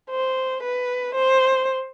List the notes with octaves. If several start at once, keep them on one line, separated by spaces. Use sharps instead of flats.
C5
B4
C5